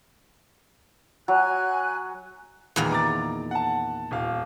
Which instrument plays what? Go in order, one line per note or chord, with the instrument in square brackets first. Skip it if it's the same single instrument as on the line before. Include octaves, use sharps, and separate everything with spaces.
[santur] F#3 [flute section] G#5 F#6
[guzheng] E2 A#2 D#3
[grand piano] A#5 D6 A6
F#5 A5
D#1 F5